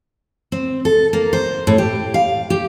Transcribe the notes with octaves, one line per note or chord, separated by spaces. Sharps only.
C4
A4
A#3
C5
A2
G4
F5
G4